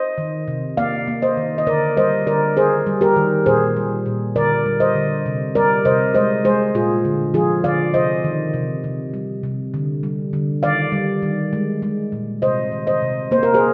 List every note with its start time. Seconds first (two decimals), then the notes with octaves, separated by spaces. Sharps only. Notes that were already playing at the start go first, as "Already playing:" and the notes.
Already playing: C5 D#5
0.18 D#3
0.48 C3
0.77 A#3 D5 F5
1.08 A#3
1.22 C5 D#5
1.37 D#3
1.58 D#5
1.67 D3 A#4 D5
1.97 G3 C5 D#5
2.27 D3 A#4 D5
2.56 D#3 G#4 C5
2.87 G3
3.01 G4 A#4
3.16 D#3
3.46 A#2 G#4 C5
3.77 G3
4.06 A#2
4.36 D3 A#4 D5
4.66 G3
4.80 C5 D#5
4.95 D3
5.26 C3
5.55 G3 A#4 D5
5.85 C3 C5 D#5
6.14 G#3 C5 D#5
6.45 G#3 G#4 C5
6.75 A#2 F4 G#4
7.05 D3
7.34 F3 F4 G#4
7.64 D3 D5 F5
7.94 C3 C5 D#5
8.24 D#3
8.54 C3
8.84 C3
9.14 G3
9.44 C3
9.74 D3
10.03 G3
10.33 D3
10.63 D#3 D5 F5
10.92 G3
11.23 D#3
11.53 G#3
11.82 G#3
12.12 A#2
12.42 C3 C5 D#5
12.72 D#3
12.87 C5 D#5
13.02 C3
13.31 A#3 C5
13.43 A#4
13.54 G#4 C5